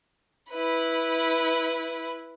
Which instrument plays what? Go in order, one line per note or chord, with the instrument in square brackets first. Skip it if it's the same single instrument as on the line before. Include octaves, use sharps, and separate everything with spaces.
[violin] E4 B4